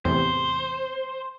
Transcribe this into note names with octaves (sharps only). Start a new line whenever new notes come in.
E2 A2 C3 C5